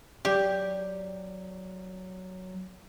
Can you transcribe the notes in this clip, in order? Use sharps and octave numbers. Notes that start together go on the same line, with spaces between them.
F#3 G4 D5